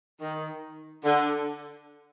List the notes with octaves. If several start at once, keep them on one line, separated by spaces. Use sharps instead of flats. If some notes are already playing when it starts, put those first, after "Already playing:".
D#3
D3